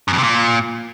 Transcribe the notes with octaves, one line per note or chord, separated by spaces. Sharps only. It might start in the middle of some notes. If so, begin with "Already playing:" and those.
F#2
F2
C3
A#2